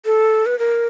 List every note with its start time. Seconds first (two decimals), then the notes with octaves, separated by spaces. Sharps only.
0.06 A4
0.46 B4
0.59 A#4